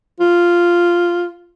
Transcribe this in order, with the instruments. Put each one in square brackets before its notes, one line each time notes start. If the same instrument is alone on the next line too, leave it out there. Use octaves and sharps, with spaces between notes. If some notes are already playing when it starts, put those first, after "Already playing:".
[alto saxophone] F4